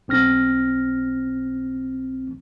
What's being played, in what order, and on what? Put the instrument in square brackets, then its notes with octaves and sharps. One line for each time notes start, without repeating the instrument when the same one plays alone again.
[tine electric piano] B1 C4 F6 A#6